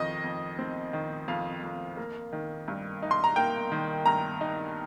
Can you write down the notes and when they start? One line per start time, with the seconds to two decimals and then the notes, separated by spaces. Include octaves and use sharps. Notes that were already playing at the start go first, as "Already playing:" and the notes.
Already playing: F2 D#3 D#5
0.24 F2
0.59 C4
0.93 D#3
1.28 F2 F5
1.63 F2
1.97 A#3
2.33 D#3
2.68 G2
3.02 D#4
3.11 C6
3.24 A#5
3.36 A#3 G5
3.72 D#3
4.06 G2 A#5
4.41 D#4